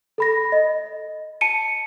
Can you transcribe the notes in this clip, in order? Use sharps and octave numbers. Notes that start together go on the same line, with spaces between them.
A4 B5 A#6
D#5
A5 C#7 D#7